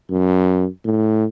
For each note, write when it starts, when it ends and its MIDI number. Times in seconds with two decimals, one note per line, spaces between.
0.10 0.67 42
0.85 1.25 45